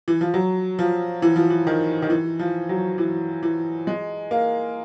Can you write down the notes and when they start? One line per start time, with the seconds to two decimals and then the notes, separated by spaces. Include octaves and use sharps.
0.08 E3
0.21 F3
0.34 F#3
0.79 F3
1.22 E3
1.36 F3
1.50 E3
1.67 D#3
2.02 D#3
2.10 E3
2.39 F3
2.69 F#3
2.98 E3
3.43 E3
3.87 G#3
4.31 A#3